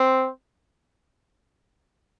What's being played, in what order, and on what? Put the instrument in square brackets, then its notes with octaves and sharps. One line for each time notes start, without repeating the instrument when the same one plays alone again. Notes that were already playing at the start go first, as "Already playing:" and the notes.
Already playing: [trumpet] C4